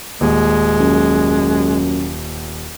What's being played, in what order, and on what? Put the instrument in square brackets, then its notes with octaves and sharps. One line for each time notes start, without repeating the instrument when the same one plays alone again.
[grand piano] D#1 [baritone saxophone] G#3
[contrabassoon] F#2